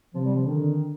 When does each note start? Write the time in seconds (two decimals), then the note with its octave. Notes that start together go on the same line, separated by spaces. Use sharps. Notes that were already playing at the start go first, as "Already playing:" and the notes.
0.14 C3 F3
0.24 G3
0.36 F3
0.47 D3 D#3